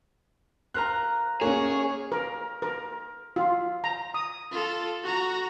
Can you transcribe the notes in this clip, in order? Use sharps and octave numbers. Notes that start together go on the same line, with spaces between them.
F4 A#4 A#5 F#6
A#3 C#4 G#4 C#5
A#4
A#4
F4
A#5
D#6
F4 A4
F#4 A#5